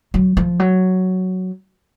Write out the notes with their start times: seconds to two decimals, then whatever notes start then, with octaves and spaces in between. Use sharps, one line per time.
0.14 F#3
0.37 F3
0.60 F#3